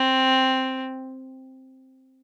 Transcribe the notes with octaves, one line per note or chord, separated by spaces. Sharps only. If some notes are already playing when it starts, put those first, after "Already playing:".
Already playing: C4